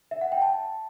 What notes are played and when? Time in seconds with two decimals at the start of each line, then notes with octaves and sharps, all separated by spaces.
0.11 E5
0.21 F#5
0.32 G5
0.42 A5